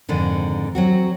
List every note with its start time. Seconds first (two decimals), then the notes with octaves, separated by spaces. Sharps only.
0.09 F2 G#2 D3 D#3
0.75 F#3 C4 F#4